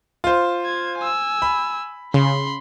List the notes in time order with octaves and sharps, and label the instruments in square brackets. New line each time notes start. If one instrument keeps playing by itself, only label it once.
[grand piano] F4 C5
[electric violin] G#6
G#5 E6
[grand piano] B5
[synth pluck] C#3 [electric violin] B5 C6